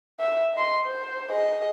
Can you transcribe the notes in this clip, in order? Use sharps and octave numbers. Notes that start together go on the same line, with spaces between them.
E5
D#5 C6
C5
G#4 D#5